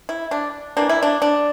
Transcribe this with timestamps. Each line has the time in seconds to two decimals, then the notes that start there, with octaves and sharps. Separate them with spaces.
0.09 E4
0.31 D4
0.77 E3 A#3 D4
0.89 E4
1.03 D4
1.22 D4